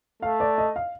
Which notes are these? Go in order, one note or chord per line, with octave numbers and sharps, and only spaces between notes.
A3 F5
D5
D#5
F5